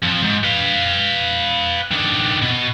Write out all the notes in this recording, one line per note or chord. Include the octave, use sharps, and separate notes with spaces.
F2 F3
G#2
B4 F5
D#3 D4
B2